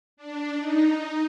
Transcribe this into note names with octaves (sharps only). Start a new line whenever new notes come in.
D4
D#4